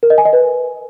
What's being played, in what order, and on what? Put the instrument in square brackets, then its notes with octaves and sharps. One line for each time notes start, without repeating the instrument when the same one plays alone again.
[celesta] A#4
D#5
G#5
D#5
B4